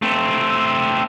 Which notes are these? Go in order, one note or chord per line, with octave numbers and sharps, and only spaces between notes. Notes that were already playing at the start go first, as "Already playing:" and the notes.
A3 C4